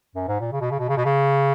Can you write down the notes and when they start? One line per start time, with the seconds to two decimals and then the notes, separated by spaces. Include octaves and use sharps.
0.16 F#2
0.28 G#2
0.40 A#2
0.52 C#3
0.61 B2
0.71 C#3
0.79 B2
0.89 C#3
0.97 B2
1.05 C#3